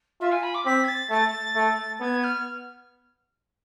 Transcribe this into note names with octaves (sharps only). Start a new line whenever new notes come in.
F4 E5
G#5
B5
D6
C4 B6
G#6
A6
A3 A6
A3
B3 G#6
F6